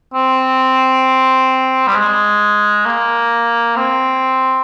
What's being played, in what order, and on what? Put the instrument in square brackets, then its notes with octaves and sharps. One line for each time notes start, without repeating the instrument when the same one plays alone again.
[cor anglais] C4
G3
G#3
A#3
C4